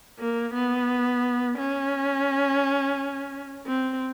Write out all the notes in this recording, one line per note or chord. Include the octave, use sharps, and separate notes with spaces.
A#3
B3
C#4
C4